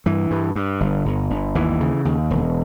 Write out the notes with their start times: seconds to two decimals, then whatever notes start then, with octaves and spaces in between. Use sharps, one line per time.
0.06 G2 E3
0.31 G2
0.56 G2
0.80 G1
1.05 G1
1.30 G1
1.55 D#2 E3
1.81 C#3
2.05 D#2
2.30 E1